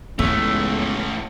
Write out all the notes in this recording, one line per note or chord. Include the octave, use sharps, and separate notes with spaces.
C#2 A2 A3 B3 C#4